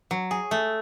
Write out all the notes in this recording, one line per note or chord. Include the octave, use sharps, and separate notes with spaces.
F#3
G#4
A3